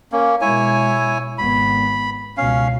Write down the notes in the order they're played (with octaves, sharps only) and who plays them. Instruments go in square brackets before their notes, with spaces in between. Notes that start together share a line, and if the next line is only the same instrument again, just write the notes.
[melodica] A#3 C#4
[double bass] B2 G#3 [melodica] E4 C#5 G#5
[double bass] G#1 B3 [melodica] B5
[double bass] C#2 B2 [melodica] C#4 F5